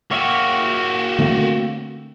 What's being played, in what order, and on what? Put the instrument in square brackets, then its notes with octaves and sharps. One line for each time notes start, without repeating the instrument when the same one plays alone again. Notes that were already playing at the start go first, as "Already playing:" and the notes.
[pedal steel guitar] A#3 C#5 E5 [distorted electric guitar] F#4 G4
[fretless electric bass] D3 A3 C4